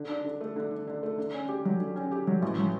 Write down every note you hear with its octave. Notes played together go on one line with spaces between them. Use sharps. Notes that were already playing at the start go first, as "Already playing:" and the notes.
Already playing: D3
D4
D3
A3
D3
D4
D3
A3
D3
C#4
G4
F#3
D3
C#4
G4
F#3
A1
F#3